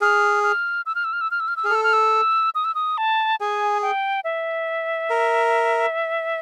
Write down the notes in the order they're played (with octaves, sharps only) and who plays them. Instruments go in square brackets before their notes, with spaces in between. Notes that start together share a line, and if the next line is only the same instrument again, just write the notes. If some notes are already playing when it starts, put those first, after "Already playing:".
[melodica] G#4 [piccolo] F6
[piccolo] F6
E6
F6
E6
F6
E6
F6
E6
F6
E6
[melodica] G#4 [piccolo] F6
[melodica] A4 [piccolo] E6
[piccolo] F6
E6
D#6
E6
D#6
A5
[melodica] G#4 [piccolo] G#5
[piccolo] G5
E5
[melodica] A#4